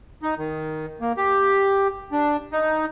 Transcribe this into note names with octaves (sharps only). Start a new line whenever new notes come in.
D#4
D#3
A#3
G4
D4
D#4